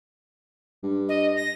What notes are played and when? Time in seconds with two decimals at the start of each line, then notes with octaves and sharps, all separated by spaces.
0.83 G2
1.09 D#5
1.36 A#6